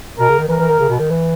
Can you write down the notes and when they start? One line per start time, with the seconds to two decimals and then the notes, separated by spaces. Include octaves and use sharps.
0.19 B2 A#4
0.29 C#3
0.39 D#3
0.49 E3 A#4
0.60 E3
0.70 D#3
0.80 C#3
0.89 B2
1.00 D#3
1.10 E3